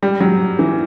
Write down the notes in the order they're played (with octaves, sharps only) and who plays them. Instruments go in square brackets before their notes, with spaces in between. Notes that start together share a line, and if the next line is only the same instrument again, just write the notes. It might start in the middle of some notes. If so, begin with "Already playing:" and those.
[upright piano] G3
F#3
E3